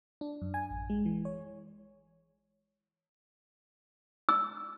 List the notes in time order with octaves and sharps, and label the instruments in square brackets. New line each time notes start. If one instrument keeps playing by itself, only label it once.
[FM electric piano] D4
F#2
G#5
A1
G#3
E3
C#5
[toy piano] E6